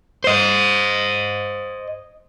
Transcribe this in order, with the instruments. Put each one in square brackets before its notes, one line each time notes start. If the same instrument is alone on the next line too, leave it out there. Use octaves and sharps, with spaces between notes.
[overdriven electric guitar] C5 D#5